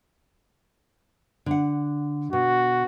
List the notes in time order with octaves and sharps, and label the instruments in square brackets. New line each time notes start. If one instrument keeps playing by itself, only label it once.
[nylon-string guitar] D3 F#5
[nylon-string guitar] B2 [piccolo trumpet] F#4